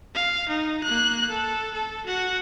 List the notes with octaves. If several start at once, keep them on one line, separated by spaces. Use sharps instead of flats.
F5
D#4
A#3 F#6
A4
A4
F#4 F#5